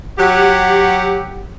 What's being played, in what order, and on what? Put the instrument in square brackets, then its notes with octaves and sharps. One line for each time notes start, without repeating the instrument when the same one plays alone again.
[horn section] F#3 G4 F#5